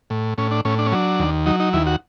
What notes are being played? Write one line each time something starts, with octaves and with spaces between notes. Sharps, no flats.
A2
A2 C#4
D4
A2 C#4
D4
C#4
F#3 D4
D#2
F#3 D#4
D#4
D#2 E4
F#4